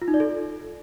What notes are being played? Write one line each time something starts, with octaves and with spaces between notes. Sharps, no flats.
F4
D#4
D5
A4